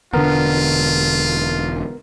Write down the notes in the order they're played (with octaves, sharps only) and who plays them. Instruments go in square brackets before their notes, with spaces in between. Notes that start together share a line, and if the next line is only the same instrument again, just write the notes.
[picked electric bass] E1 D3 D4 [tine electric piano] B3 A#4 [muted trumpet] F4